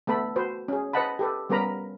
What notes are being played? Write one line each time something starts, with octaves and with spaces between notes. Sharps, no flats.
A3 B3 A4 B5
F#4 B4 C5
C#4 G#4
B4 C5 D#5 F#5 A5 B5
G4 A4 B4
G3 B3 C#4 A#4 A#5 B5